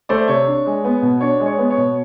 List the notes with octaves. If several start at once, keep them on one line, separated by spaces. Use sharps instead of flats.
A3 C5 D5
C3 C#5
D4
G#3
B3
B2
D4 C#5
G#3
C#5
B3
C#5
B2